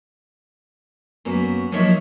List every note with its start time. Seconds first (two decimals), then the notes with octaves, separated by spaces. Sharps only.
1.25 F#2 A#3 B3 F#4
1.72 F3 F#3 A#3 D#4 C#5 E5